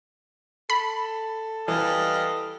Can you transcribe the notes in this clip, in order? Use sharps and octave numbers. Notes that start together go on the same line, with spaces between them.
A4 B5
E3 G3 D#5 F5